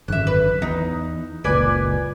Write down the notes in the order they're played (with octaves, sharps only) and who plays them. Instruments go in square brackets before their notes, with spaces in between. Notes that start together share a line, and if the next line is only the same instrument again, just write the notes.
[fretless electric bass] G#1 F#2 D3 [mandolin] E5 F#6
[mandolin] B4
[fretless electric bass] E2 [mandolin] D#4
[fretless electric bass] F#1 C#2 A#2 [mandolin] B4 D5 G#5